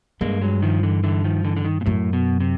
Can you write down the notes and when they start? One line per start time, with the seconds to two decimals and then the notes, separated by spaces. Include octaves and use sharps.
0.21 G2 G#3 A#3
0.41 F#3 G#3
0.62 D#3 F3
0.83 D3 E3
1.04 D3 E3
1.24 D#3 F3
1.44 D3 E3
1.57 D3
1.65 D#3
1.81 A#2
1.86 F#2 A2
2.13 B2
2.40 C3